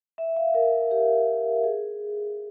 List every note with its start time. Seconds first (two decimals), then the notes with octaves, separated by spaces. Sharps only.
0.18 E5
0.37 F5
0.54 A#4
0.91 G4
1.64 G#4